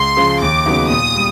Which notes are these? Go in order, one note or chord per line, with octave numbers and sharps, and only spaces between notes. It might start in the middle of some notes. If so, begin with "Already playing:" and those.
Already playing: C#2 C6
C#3 F3 G#3
D#2 D6
C#3 F#3 B3 D#4
A#2 D#6
G3